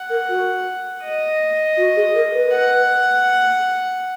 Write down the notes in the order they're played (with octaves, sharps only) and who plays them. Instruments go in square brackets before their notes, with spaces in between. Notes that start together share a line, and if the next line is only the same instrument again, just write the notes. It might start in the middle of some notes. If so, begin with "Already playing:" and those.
Already playing: [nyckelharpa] F#5
[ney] A#4
F#4
[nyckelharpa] D#5
[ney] F#4
G#4
A#4
B4
[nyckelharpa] F#5